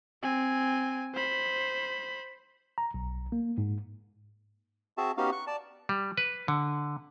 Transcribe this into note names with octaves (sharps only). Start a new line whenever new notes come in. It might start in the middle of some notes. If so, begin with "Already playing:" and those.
C4 G#5
C5 B5
A#5
B1
A#3
G#2
C4 F#4 G#4 E5 A5
B3 C#4 D#4 F#4 G4 F5
C#6 F#6
D5 A5
G3
B4
D3